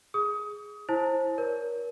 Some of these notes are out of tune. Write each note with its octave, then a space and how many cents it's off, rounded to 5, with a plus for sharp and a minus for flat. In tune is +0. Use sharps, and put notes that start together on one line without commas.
G#4 +0 D#6 +25
E4 +0 C5 +25 A5 -35
A#4 +40 C#5 +35